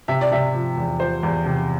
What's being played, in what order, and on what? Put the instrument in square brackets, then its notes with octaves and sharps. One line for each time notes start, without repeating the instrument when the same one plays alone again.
[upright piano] C3 [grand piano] E5
[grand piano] D5
[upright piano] C3 [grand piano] E5
[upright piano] F3
E2
[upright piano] F3 [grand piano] C5
[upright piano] E2
C3